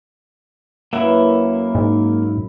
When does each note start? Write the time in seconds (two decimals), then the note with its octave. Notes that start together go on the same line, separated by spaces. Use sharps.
0.93 F#2 A#3 E4 B4 E5 F#5
1.75 G#2